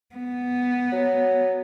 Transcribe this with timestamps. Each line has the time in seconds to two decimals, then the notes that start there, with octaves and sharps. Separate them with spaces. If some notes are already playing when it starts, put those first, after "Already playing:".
0.15 B3
0.92 F#3